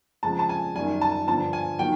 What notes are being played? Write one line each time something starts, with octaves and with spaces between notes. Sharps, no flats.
F2 C#3 F3 G#3 A5
A5
G#5
F#2 D#3 G3 G#5
A5
G2 D3 F3 A5
G#5
D#3 F#3 G5